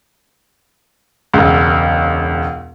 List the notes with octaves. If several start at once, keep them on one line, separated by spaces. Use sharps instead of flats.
E1 C#2